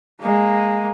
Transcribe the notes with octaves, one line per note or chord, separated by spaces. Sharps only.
G#3 A#3